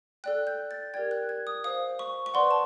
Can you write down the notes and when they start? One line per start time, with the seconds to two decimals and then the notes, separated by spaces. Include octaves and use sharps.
0.24 A4 D5 G5 F#6
0.47 G6
0.71 A6
0.94 G4 A#4 D5 G5 G#6
1.11 F#6
1.29 G#6
1.47 D#6
1.64 C5 F5 D#6
1.99 C#6
2.26 C#6
2.34 B4 D5 F#5 C6
2.51 A5